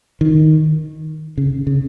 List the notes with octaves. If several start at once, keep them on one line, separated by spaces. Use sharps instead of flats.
D#3
C#3
C#3